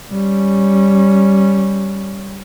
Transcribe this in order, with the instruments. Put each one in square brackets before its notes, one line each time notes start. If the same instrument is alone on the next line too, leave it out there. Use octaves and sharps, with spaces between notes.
[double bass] G3 C#4